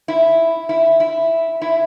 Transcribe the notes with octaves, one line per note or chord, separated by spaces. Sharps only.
E4
E4
E4
E4